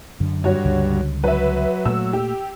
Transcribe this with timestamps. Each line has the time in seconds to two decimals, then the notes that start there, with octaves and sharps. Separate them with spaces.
0.20 F#2 D3
0.44 G2 F#4 C#5
0.64 C#2 D3 G3
1.24 F#3 B4 E5
1.85 A#2 A3 E6
2.13 G4